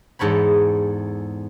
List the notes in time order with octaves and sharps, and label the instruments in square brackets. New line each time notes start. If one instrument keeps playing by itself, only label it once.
[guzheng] E2 G#2 A4 C#5 B5